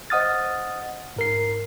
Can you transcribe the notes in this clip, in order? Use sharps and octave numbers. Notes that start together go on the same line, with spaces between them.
C5 D#5 F#5 D#6 F6 A6
G#2 A#4 C7